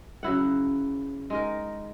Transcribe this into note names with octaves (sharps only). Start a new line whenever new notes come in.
C#3 F#3 E4 F#5
G#3 D#4 A#4